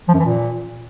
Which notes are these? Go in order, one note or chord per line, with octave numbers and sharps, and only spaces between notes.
F3
F#2
E3
A#2